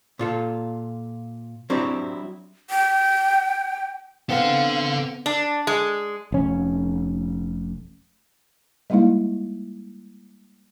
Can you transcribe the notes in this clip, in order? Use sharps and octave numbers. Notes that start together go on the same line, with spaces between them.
A#2 F4 A4
F#3 C4 D4 E4 G4
G5
B3 C4 A4 F5 F#5
D4
G#3
F1 C#4
G3 G#3 A#3 D#4 E4 F5